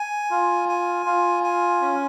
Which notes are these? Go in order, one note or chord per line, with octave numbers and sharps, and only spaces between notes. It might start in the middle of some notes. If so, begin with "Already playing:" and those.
Already playing: G#5
F4
G#5
F4
G#5
C#4